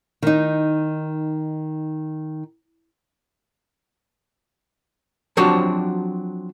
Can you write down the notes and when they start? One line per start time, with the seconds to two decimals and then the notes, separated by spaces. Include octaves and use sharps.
0.22 D#3 D#4
5.37 F3 F#3 C4 D4 F#4 G4